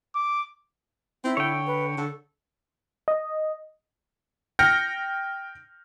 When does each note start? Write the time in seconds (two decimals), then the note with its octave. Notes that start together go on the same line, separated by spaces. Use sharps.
0.15 D6
1.24 C4 E4
1.37 D3 C#5 G5
1.67 B4
1.98 D3 A4
3.08 D#5
4.59 G5 F6 G6 A#6 C#7